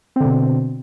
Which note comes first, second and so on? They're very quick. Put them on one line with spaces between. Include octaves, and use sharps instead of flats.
C4 D3 B2